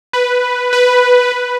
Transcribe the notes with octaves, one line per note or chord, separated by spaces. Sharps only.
B4
B4
B4